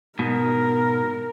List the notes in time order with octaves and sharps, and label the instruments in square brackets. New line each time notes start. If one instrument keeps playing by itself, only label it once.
[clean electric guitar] G#2 B2 [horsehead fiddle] A#4